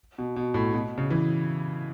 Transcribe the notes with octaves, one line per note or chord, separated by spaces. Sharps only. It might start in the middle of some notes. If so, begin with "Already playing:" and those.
B2
B2
A2
B2
C#3
E3